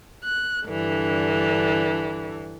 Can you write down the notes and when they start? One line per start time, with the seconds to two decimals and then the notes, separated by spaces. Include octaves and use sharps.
0.25 F#6
0.65 G2 D3 E3